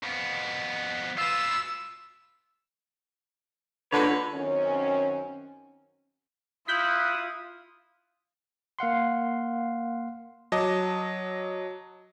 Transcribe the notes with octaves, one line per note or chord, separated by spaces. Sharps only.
F2 B3
F4 B4 E6
D3 A#3 D4 D#4 F4 A4 B4 C#5
F#2 D#3 C4 C#4
E4 F4 D#6 F#6 G6 B6
A#3 F5 F#5 C6
F#3 D#5 A5 D6